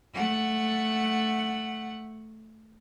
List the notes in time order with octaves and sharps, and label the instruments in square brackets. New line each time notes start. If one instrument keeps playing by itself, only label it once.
[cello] A3 F#5